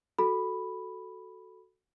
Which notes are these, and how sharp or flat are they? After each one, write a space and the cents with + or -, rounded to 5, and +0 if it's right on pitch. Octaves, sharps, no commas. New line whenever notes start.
F#4 +0 A4 +0 B5 +0